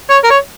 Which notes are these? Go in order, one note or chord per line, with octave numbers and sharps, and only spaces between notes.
C#5
A#4
C#5